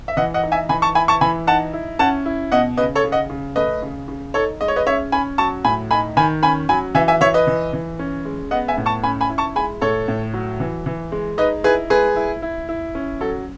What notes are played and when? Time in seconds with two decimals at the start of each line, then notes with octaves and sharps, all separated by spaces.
0.08 E5
0.17 E3 D#5 F#5
0.34 D#5 F#5
0.43 D#4
0.52 E5 G#5
0.69 E3 G#5 B5
0.82 A5 C#6
0.95 E4 G#5 B5
1.08 A5 C#6
1.21 E3 G#5 B5
1.47 D#4 F#5 A5
1.73 E4
1.99 C#4 F#5 A5
2.26 E4
2.52 B2 D#5 F#5
2.77 C#3 B4 D#5
2.95 A4 C#5
3.04 C#3
3.12 D#5 F#5
3.30 C#3
3.56 A3 B4 D#5
3.82 C#3
4.08 C#3
4.34 D#4 A4 C#5
4.61 G#3 D#5
4.68 C#5
4.76 B4 D#5
4.86 C#4 C#5 E5
5.12 C#4 G#5 B5
5.38 F#3 A5 C#6
5.64 A2 G#5 B5
5.91 D#4 G#5 B5
6.17 D#3 G#5 B5
6.43 C#4 G#5 B5
6.69 F#3 G#5 B5
6.95 E3 E5 G#5
7.08 E5 G#5
7.21 E3 C#5 E5
7.34 B4 D#5
7.47 E3
7.73 E3
7.99 C#4
8.25 G#3
8.51 B3 D#5 F#5
8.68 E5 G#5
8.78 A2
8.86 A5 C#6
9.03 C#4 G#5 B5
9.21 G#5 B5
9.30 E4
9.38 A5 C#6
9.55 G#3 G#5 B5
9.81 A2 A4 C#5
10.08 A2
10.34 F#3
10.60 E3
10.86 E3
11.12 G#3
11.38 D#4 B4 D#5
11.64 E4 G#4 B4
11.90 G#3 G#4 B4
12.16 E4
12.42 E4
12.69 E4
12.95 C#4
13.21 F#3 A4